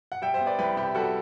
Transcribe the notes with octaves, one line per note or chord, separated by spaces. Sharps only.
F#5
G3 E5 G5
C5 E5
B3
B4 D5
C2 G4 B4
C3 G4
G3 F#4 A4